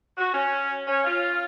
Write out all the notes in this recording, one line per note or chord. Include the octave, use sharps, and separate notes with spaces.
F#4
C#4
C#4
F4